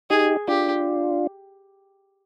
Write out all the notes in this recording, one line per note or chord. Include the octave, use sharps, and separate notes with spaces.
D#4 G4 G#4
D4 F4 G4